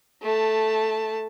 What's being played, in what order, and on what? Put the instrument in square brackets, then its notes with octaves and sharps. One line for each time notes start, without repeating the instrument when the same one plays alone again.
[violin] A3 A5